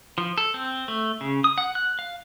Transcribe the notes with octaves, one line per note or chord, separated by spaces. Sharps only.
F3
A4
C4
A3
C#3
D#6
F#5
F#6
F5